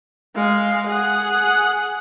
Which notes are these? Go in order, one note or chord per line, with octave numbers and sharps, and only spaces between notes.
G#3 F5
G#4 F#5